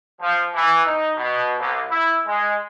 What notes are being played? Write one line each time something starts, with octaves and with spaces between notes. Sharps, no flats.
F3
E3
D#4
B2
C2
E4
G#3